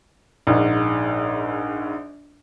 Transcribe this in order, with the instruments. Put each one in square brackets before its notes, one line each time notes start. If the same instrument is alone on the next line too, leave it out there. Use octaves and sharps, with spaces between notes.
[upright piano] A#1 G#2